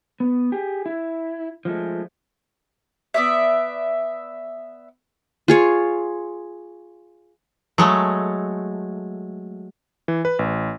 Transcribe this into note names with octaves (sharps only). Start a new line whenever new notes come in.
B3
G4 G#4
E4
F3 G#3 A3
B3 D5 E5
F4 G#4 C#5
F#3 G#3 A3
E3
B4
A1